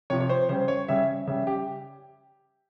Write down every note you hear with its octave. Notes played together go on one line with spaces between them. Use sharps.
C3 F3 C#5
C#5
C5
C#3 G3 C5
C#5
C#3 G3 E5
C#3 G3 E5
G4